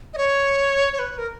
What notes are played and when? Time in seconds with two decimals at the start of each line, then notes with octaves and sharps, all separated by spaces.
0.14 D#5
0.18 C#5
0.93 C#5
0.99 B4
1.18 A#4